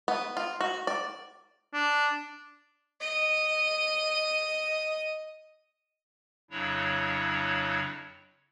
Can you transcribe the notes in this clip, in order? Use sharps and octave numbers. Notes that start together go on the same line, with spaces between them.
B3
F4
F#4
D5
D4
D#5 D#7
F2 C#3 F#3 D4 E4 C#5